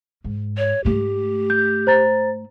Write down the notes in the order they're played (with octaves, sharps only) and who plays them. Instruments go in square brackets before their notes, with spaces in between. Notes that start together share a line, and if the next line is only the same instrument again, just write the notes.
[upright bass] G#2
[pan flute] C#5
[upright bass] G#2 A3 [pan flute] G4
[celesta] G6
C5 A#5 A6